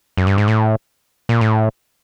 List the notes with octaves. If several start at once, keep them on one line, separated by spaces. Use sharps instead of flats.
F#2
G2
G#2
A2
A#2
A2